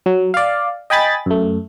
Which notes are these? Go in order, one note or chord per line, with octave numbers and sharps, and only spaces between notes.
F#3
D5 F5
D#5 G5 G#5 B5 A6
F#2 A3